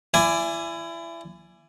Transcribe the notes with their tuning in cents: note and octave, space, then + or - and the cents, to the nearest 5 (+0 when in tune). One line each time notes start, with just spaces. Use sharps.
E4 +30 D5 +0 G#5 +0